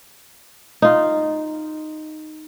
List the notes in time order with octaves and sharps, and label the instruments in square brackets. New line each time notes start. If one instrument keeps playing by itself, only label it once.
[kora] D#4 F4